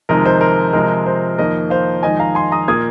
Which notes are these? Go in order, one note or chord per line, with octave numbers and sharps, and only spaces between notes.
F2 C3 D#3 G#3 A#4 D#5
C5
A#4
C3 F3 G#3 A#4
C5
F2 D#3 A#3 A#4 D#5
C5 F5
F2 D#3 G#3 D#5 G#5
F5 A#5
G#5 C6
A#5 D#6
A#2 A#3 D#6 G#6